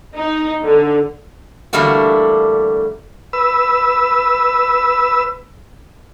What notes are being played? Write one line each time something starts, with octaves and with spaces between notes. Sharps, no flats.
D#4
D3
E2 D3 G3 A3 A#3 F#4
B4 E6